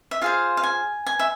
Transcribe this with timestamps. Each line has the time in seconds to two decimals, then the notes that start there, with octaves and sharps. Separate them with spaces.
0.11 E5
0.21 F4 G#4 C5 F5
0.57 F5
0.63 G#5
1.06 G#5
1.19 E5